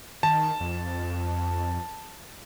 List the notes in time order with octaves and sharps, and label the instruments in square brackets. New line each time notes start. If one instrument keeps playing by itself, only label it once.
[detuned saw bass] D#3 [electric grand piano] A5
[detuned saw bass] F2